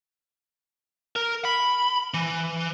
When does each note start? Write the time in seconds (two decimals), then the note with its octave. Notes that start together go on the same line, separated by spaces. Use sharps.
1.16 A#4
1.45 B5
2.14 E3